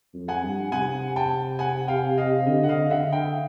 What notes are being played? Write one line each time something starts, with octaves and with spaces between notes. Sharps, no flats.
F2
F#5 G#5
G2
C3 F#5 G#5
G5 A5
F#5 G#5
F5 G5
D#5 F5
D3 D#5
F#5
D#5 F5
D3 E5 F#5
F5 G5